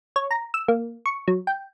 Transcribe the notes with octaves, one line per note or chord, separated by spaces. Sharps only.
C#5
A#5
E6
A#3
C#6
F#3
G5